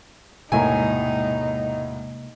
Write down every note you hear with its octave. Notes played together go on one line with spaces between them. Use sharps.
E1 A2 C3 G#3 A#3 D#4 A#4 G#5